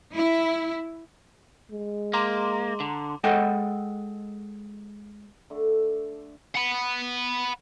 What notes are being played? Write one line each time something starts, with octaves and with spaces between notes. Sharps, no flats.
E4
G#3
A#3 A#5 C6 D6
D3
G#3 A4 D#5 F#5 G5
D3 A3
F#5 B5